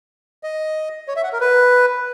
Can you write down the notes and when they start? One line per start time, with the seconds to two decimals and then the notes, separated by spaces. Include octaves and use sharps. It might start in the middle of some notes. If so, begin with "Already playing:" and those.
0.43 D#5
1.08 C#5
1.16 E5
1.23 F#5
1.33 A#4
1.40 B4